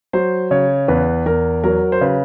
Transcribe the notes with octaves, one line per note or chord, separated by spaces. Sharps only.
F#3 C5
C#3 C#5
E2 B4
E2 A#4
F#3 A#4
C5
C#3 B4